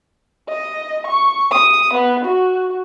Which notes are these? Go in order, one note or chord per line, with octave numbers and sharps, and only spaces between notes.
D#5
C#6
D#6
B3
F#4